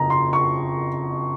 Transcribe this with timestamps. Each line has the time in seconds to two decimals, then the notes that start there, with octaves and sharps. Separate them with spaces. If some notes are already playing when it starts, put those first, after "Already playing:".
Already playing: F#1 F2 A#5
0.10 C6
0.33 C#6